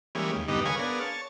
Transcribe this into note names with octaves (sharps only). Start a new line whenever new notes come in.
E3 G3 G#3 A#3 C#4
D#2
G2 D3 D#3 G3 B3 D#4
G#4 A#4 B4 C#5 F5 G#5
B3 D4 G#4 A#4 F5
C#5 A5